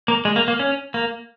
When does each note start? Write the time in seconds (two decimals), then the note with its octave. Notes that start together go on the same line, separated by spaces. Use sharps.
0.08 A#3
0.25 G#3
0.36 A#3
0.48 A#3
0.59 C#4
0.94 A#3